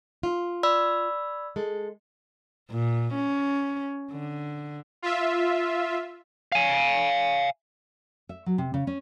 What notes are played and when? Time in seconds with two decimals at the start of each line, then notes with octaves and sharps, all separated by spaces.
0.23 F4
0.63 D5 B5 E6
1.56 G#3 A4
2.71 A#2
3.15 C#4
4.12 D3
5.02 F4 E5
6.52 F5 G#5
8.29 E5
8.46 F#3
8.58 C3
8.74 C#3
8.87 C#4